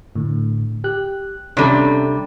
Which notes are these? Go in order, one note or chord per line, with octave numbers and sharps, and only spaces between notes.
A2 D3
G4 F#6
C3 G3 C#4 D4 A4